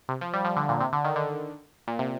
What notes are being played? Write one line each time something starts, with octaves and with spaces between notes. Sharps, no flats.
C3
F3
G3
F3
D3
A#2
C3
D3
D#3
D3
A#2
C3